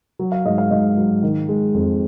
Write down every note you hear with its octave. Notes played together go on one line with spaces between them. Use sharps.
F#3
F5
G#2 D#5
F5
G#2 D#5
F#3
D#3
G#3
F2